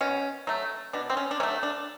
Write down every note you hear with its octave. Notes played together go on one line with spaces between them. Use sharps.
B2 C#4
F#3 A3
B2 D4
C4
C#4
D4
F#3 A3 C#4
D4